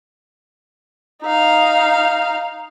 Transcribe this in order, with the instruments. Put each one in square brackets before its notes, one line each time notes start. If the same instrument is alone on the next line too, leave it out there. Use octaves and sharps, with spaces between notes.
[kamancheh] D#4 F5